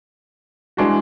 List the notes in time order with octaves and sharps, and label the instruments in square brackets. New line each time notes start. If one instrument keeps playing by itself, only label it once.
[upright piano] E3 G#3 D4 F#4